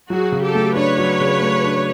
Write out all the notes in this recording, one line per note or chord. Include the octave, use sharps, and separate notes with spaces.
F#3 F#4 G#4
C#3
G4 A4
A3
D4 B4 C#5
F#3
C#3
A3
D4